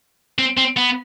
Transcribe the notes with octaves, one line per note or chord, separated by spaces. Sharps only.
C4
C4
B3